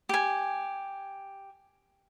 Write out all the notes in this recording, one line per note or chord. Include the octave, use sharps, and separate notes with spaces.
G4 G#5